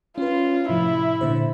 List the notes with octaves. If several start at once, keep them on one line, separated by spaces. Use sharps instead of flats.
C#4 F4 B4
A2 C3 F3 E4
A#2 D3 C5